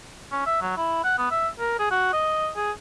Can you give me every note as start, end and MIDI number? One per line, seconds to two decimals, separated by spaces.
0.32 0.44 61
0.46 0.60 76
0.62 0.73 54
0.77 1.00 64
1.04 1.15 78
1.18 1.29 59
1.31 1.48 76
1.59 1.77 70
1.79 1.87 68
1.91 2.13 66
2.13 2.50 75
2.56 2.71 68